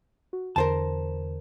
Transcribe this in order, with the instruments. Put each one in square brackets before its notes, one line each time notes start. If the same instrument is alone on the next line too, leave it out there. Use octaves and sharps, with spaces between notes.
[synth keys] F#4
[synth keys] E2 D3 [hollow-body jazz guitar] A#4 C5 A5